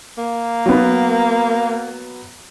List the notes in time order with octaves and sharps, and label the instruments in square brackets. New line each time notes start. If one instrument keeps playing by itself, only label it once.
[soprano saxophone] A#3
[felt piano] F#3 B3